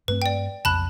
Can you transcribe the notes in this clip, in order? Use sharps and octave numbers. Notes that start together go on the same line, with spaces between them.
G2 A3 C4 B4
D5 G5
B1 F2 C#3 A5 B5 F#6